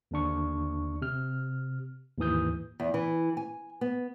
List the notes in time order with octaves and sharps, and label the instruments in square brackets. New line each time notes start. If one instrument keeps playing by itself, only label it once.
[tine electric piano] D#2 D3 D4 C#6
C3 F6
D#2 G#2 E3 D#6 G6
[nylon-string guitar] E2
E3
G#5
B3